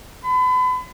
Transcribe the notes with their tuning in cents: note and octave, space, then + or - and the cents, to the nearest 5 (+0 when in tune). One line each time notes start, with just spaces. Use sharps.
B5 +35